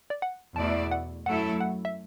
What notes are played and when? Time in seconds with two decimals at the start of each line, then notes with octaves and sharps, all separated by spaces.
0.10 D5
0.22 F#5
0.56 E2 B2 A3 E4 D5 A5
0.91 F#5
1.26 F#2 F#3 A3 E4 A4 F#5
1.60 F#5
1.85 E5